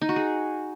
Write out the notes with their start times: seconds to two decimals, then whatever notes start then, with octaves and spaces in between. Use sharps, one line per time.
0.02 D#4
0.09 F#4
0.16 G#4